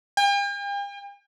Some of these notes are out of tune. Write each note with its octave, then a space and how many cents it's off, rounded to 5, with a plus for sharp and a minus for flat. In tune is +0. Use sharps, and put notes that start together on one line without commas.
G5 +45